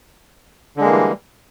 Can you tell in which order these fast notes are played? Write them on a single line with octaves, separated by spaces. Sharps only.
D3 G#3 A#3 E3 G3